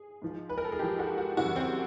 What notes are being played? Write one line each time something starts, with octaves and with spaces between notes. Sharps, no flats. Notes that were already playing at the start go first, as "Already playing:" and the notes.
Already playing: G#4
G#2 F3
B4
A#4
A4
G#4
G#2 F3 G4
F#4
F#4
F#2 C#3 E3 G3 F#4
C4